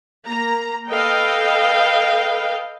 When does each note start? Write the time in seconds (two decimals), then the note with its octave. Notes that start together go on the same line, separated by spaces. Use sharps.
0.25 A#3 A#5
0.90 A4 B4 D#5 F5 G5